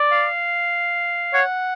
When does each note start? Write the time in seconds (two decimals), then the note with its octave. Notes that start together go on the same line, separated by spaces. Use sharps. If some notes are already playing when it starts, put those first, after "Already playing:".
Already playing: D5
0.11 F5
1.33 C#5 F#5